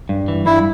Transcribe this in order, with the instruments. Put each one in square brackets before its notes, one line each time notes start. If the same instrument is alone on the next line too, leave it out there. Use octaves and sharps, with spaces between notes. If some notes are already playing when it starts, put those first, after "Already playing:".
[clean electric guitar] G2
E3
[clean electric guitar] G2 [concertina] E4